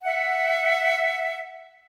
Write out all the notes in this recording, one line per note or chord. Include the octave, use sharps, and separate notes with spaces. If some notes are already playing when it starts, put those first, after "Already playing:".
E5 F#5